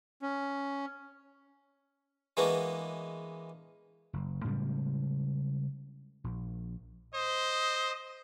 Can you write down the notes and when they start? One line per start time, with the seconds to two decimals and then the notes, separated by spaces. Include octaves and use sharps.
0.22 C#4
2.37 E3 G#3 A#3 B3 D4 F#4
4.13 F#1
4.44 A2 C#3 G3 G#3
6.24 A#1
7.14 C5 D#5